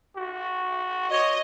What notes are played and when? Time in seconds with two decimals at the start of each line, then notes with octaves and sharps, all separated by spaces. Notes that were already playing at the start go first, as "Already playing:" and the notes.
0.16 F#4
1.11 C#5 D#5